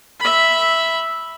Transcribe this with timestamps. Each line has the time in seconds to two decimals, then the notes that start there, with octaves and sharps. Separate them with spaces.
0.20 E5 B5